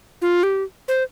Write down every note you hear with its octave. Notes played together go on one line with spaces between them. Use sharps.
F4
G4
C5